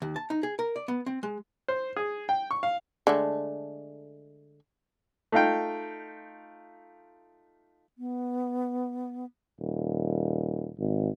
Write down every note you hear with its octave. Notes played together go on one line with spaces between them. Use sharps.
D#2
A5
D#4
G#4
A#4
D5
B3
C4
G#3
C5
G#4
G5
C#6
F5
D3 G#3 A3
A3 D#4 F4 F5 G5
B3
D#1
G#1